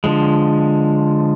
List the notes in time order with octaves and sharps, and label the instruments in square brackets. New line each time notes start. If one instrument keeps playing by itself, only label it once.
[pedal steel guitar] D3 F3 G#3